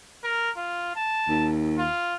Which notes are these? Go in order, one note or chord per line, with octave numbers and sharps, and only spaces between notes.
A#4
F4
A5
D#2
F4